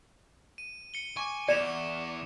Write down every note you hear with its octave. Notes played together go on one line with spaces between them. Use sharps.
D#7
C#7 G7
G#5 C#6 D6
E2 D5 C#7 E7 F7